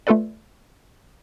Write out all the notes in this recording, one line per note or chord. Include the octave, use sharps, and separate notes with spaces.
A3 F4 A4 B4 D5